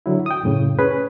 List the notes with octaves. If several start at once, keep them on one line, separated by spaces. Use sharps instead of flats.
D3 F#3 E4
G5 D#6
F#2 A2 C#3
C#4 G#4 B4